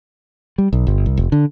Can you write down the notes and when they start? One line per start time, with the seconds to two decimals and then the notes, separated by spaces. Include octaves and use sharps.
0.58 G3
0.73 B1
0.87 G1
1.06 C2
1.17 F1
1.32 D3